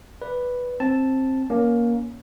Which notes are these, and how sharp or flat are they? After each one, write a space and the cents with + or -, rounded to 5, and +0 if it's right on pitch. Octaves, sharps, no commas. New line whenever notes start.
B4 +0 D5 +0
C4 +15 A5 +0
A#3 +15 C#4 +15